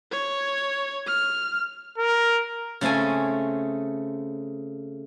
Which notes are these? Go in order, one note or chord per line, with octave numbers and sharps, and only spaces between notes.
C#5
F6
A#4
C#3 A3 C4 A4 G#5